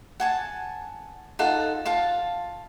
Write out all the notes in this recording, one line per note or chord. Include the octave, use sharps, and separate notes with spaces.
F#5 G#5 A5
D#4 F4 A4 F#5
F4 F5 A5